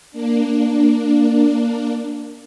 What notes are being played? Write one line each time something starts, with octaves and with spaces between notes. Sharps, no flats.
A#3 D4